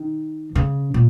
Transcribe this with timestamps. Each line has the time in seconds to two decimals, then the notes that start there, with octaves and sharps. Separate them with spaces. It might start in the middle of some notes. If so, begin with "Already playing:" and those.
Already playing: D#3
0.55 C#3
0.94 A#2